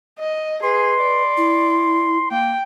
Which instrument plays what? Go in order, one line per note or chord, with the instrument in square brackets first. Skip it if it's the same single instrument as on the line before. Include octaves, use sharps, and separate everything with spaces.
[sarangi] D#5
[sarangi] G#4 [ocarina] B4 [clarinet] C6
[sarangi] D5
[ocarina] E4
[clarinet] A#3 [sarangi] G5